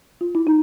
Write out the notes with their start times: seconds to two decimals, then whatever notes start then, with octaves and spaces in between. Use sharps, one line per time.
0.21 F4
0.35 E4
0.47 D#4